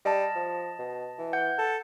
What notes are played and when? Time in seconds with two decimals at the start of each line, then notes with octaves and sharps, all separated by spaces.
0.05 G3 D#5 A5
0.35 F3
0.79 B2
1.18 E3
1.33 F#5 G6
1.58 A4